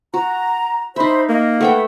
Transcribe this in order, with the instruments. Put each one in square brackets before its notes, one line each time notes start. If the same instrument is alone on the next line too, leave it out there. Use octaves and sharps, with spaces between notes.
[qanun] F#4 [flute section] A#5
[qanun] D#4 E5 [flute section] C5 B5
[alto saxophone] A#3 [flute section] D#5
[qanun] A3 E5 G5 [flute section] B4 F#5